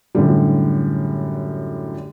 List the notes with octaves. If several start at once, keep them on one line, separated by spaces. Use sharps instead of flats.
F#2 A2 D3 G3